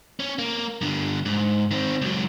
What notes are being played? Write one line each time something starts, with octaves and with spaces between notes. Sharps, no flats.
C#4
A#3
G2 D3
G#2
D#3 C4
C#2 F#3